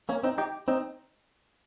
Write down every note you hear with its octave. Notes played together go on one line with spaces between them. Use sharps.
A#3 C#4
C4 D#4
D#4 G4
C4 D#4